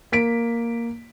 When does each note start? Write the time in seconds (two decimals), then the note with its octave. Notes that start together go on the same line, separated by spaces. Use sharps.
0.12 A#3 B6 D7